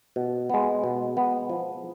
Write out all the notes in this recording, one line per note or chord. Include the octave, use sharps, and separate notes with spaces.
B2
G#3 B3
B2
G#3 B3
F3